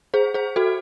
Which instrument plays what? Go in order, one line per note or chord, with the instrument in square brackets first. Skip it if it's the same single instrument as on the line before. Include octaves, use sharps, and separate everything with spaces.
[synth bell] G#4 C5
G#4 C5
F#4 A4